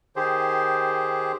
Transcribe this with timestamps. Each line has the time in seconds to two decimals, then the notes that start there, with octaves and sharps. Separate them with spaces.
0.16 D#3 G4 G#4 C5